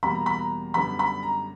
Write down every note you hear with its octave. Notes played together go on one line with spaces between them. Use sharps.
E2 B2 G3 A#3 B5
A#5
B5
A#5
F#2 D3 G3 B3 B5
B5
A#5